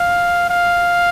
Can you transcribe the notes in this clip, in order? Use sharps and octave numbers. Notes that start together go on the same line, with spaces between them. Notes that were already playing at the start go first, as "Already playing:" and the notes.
Already playing: F5
F5